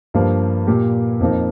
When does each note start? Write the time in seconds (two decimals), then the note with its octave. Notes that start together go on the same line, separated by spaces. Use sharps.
0.14 G2 F3 A#3
0.67 A#2 A#3 G4
1.20 F2 F3 A#3 D#4